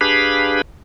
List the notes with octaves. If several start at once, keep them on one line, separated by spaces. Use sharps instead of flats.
D4 G4 G#4 B4 F5 B5